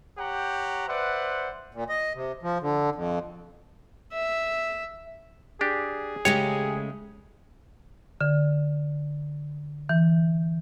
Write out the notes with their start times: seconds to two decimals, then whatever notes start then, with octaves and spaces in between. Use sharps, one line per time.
0.18 G4 C#5 F#5 G5 A#5
0.88 B4 C5 D5 E5 F#5
1.74 A#2
1.89 D#5
2.15 C3
2.43 F3
2.62 D3
2.95 F2
4.13 E5
5.61 D4 G4 G#4
6.25 C#3 G#3 A3 G4 C#5
8.21 D3
9.89 E3